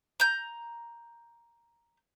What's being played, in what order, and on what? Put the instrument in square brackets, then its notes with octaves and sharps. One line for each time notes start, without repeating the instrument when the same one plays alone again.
[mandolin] A#5 G6